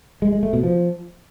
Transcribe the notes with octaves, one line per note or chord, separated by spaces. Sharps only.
G#3
G#3
A3
B2
F3